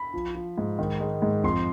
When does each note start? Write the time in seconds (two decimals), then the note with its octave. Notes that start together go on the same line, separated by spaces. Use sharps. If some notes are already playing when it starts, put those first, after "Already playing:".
Already playing: B5
0.14 F3
0.35 F3
0.58 G#2
0.79 D#3
1.00 G#3
1.22 G#2
1.44 F2 C6